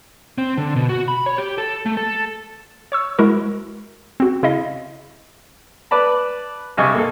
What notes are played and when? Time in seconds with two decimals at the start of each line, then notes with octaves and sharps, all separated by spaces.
0.38 C4
0.57 D3
0.76 B2
0.89 F#4
1.08 B5
1.26 C#5
1.38 G4
1.58 A4
1.86 A3
1.97 A4
2.92 C#5 C#6 E6
3.19 G#3 E4 F#4 A#4
4.20 C4 F#4
4.43 C#3 E4 D#5 F5
5.91 B4 D5 A5 B5
6.77 G2 C3 D#5 G#5 C#6
6.95 A#3 A4